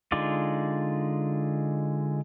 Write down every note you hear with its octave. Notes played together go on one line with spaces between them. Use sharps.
D3 G#3 D#4 F4 D5